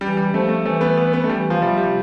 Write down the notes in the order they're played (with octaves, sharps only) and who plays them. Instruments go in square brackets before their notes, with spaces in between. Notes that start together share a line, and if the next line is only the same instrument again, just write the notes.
[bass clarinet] E3 [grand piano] G3
[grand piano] G3
[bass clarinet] F3 [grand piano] A3
[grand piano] A3
[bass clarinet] E3 [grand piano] A3
[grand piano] B3
B3
B3
A3
[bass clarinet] E3 [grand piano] G3
[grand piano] F3
[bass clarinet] C3 [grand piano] G3
[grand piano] G3